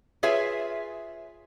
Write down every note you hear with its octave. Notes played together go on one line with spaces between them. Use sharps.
F4 G#4 B4 C#5 E5